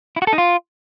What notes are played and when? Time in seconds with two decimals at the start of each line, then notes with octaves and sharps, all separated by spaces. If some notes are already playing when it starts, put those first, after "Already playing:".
0.16 E4
0.22 F#4
0.27 A4
0.33 D#4
0.38 F4